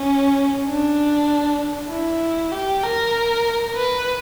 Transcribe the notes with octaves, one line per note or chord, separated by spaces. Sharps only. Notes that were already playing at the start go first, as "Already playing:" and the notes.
Already playing: C#4
D4
E4
G4
A#4
B4